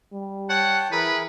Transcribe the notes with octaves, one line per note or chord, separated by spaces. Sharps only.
G3
C#5 F#5 G5 A5
E3 E4 G#4 A#4 B4